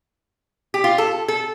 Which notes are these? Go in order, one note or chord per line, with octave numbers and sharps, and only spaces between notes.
G4
F4
A4
A4